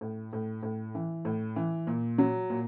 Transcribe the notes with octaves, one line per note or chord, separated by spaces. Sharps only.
A2
A2
A2
E3
A2
E3
A#2
F#3
A#2